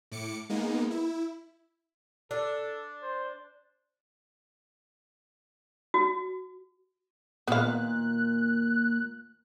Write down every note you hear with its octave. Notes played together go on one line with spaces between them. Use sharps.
A2 D6 C#7
G#3 A#3 B3 D#4
E4
D4 A4
C5
F#4
D#2 A#2 B3 F5 F#6